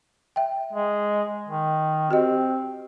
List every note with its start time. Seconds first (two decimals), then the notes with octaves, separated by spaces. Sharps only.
0.36 E5 G5
0.73 G#3
1.48 D#3
2.11 C4 F#4 G4 D#5